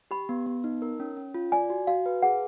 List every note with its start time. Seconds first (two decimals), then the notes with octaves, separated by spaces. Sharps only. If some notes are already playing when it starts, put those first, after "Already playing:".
0.11 G4 B5
0.29 B3
0.47 B3
0.64 D#4
0.82 A#4
1.00 C#4
1.17 C#4
1.34 F4
1.52 D5 G#5
1.70 F#4
1.87 F#4 F5
2.06 B4
2.22 G#4 F#5